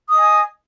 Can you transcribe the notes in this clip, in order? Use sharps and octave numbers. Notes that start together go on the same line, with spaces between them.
D#5 G#5 D#6